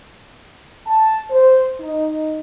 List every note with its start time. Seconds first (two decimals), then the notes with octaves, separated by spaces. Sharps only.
0.87 A5
1.30 C5
1.80 D#4